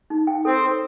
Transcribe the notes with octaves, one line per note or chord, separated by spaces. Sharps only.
D#4
G5
C4 A4
A4